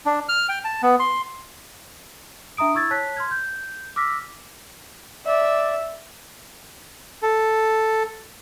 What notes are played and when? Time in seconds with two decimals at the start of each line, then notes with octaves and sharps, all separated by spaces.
0.06 D4
0.29 F6
0.49 G5
0.64 A5
0.82 B3
0.99 C6
2.57 D4 E5 A#5 D#6 D7
2.74 E4 C#6 E6 G#6 A6
2.91 C#5 A5 F#6 B6
3.16 C6 F6 G#6
3.31 G6
3.96 D6 E6 F6 A#6 B6
5.26 D5 E5
7.23 A4